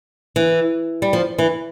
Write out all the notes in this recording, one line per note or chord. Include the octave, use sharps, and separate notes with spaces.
E3
G3
F3
E3